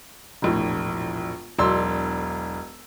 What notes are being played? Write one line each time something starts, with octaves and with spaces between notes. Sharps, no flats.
E1 A#1 A2
E1 B1 D5 C6 E6